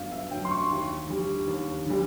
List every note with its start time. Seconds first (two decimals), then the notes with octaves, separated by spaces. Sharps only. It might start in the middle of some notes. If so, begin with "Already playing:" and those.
Already playing: G1 F#2 D3 F#3 F5
0.12 E5
0.31 F#2 D3 F#3 G5
0.45 C6
0.51 C#6
0.70 D#2
1.09 D3 G3
1.48 D#2
1.86 D3 G3